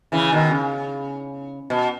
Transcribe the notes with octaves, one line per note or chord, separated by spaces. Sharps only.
C#3 E3
B2 D#3
C#3
B2